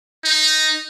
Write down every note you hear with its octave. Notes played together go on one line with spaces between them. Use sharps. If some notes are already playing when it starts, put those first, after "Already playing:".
D#4